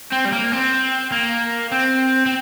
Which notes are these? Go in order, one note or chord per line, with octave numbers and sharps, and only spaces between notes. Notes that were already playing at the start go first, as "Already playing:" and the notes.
C4
G3
A#3
C4
A#3
C4
C4